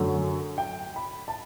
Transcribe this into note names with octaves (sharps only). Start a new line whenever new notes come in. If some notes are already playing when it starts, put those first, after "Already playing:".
Already playing: F#2 D3 F#3 A3
G5
B5
A5